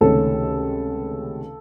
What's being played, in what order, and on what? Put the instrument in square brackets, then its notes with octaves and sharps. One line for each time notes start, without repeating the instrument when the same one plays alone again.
[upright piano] C#2 C3 D#3 A3 C#4 A4